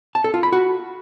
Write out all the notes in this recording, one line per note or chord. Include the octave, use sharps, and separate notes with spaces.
A5
A4
F4
B5
F#4